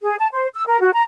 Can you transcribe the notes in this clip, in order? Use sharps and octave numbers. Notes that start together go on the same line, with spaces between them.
G#4
A5
C5
E6
A#4
F#4
A#5